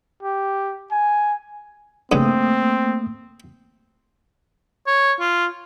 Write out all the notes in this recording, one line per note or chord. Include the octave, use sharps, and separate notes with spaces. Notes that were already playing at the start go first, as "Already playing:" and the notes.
G4
G#5
G2 C#3 A3 A#3 C4 D#6
C#5
F4